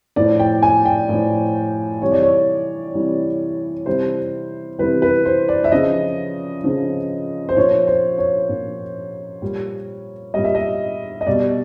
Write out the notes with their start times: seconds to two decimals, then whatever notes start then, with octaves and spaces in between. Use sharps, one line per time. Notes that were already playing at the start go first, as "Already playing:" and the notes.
0.16 A2 F3 D5
0.39 G5
0.63 G#5
0.85 G5
1.09 A2 F3
2.02 C3 E3 G3 C#5
2.12 D5
2.23 C#5
2.94 C3 E3 G3
3.86 C3 E3 G3 C5
4.78 C3 E3 G3 B4
5.02 B4
5.25 C5
5.48 D5
5.64 E5
5.72 C#3 F3 D#5
6.64 C#3 F3
7.49 C5
7.57 A#2 F3 C#5
7.87 C5
8.18 C#5
8.49 A#2 F3
9.42 A#2 G3
10.34 A#2 G3 D#5
10.44 E5
10.55 D#5
11.21 D#5
11.27 B2 G3 D5